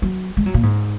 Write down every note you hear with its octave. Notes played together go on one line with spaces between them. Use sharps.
F#3
G#3
F#3
A#2
G#2